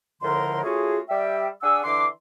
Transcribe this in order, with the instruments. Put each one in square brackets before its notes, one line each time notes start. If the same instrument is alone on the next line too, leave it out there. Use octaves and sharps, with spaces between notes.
[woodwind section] C#2 A2 D3 F3 A#4 C6
A3 C#4 F4 F#4 G#4
G3 E5 G5
D4 G#4 F#5 G#5 E6
D3 E3 D4 C6 D6